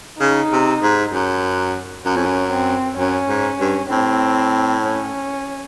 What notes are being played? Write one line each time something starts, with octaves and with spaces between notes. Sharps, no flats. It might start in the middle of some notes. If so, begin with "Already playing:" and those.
C#3 D#4
C3
G#2
F#2
F#2 C#4
F2
F#2
C4
F#2 C#4
G#2
G2
A2 C4
C#4